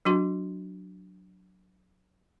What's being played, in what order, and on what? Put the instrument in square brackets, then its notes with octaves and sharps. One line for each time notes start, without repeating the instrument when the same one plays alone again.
[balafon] F#3 D4 F#4 C6